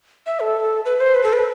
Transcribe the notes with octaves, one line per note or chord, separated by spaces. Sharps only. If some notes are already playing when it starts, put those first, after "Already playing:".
E5
A4
B4
C5
B4
A4
B4